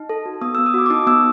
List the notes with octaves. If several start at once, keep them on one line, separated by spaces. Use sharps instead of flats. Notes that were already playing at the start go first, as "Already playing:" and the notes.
Already playing: D#4
A4
F#4
B3 D#6
B3 E6
D#6
F#4 D6
D6
D#4 D#6
B3 E6